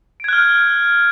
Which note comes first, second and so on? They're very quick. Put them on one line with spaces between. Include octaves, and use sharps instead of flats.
D7 G#6 F#6 F6